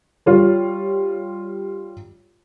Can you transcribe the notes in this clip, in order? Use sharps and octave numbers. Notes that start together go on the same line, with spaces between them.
G3 F4 C#5